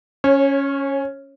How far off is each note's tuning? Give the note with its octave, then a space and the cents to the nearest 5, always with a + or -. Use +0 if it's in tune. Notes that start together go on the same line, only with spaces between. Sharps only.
C#4 +0 C#5 -25